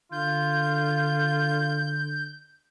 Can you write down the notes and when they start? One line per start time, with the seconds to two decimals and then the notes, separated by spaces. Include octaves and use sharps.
0.12 D3 F4 G6